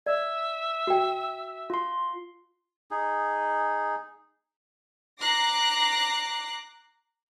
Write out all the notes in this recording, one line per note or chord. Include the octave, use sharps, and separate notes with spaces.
D5 E5
F#4 G5
F4 C6
D#4 G#4
A#5 D6 F#6 A#6 C7